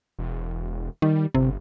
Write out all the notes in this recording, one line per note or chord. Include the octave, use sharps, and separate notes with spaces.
E1
D#3 G3
G1 C3